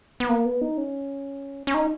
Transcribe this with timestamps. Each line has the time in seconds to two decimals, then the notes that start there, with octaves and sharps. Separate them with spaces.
0.20 B3
0.29 A#3
0.45 B3
0.61 D#4
0.78 C#4
1.67 C#4
1.74 D#4